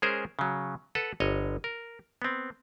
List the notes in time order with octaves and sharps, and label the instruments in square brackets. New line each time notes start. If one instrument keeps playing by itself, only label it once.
[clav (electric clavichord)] G#3 C#4 G#4 A#4 C5
C#3 F#3
A4 B4 F#5
G1 C#5 D#5
A#4
B3 C4